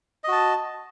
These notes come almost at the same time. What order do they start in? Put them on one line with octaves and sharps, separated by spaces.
D#5 F#4 A5